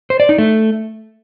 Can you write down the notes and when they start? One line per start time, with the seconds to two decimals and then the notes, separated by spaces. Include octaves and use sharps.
0.10 C5
0.20 D5
0.29 D#4
0.38 A3